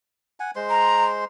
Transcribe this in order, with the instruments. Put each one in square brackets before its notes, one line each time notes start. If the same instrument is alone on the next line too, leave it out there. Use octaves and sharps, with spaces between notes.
[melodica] F#5 G#5
G#3 C5 C6
[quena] A#5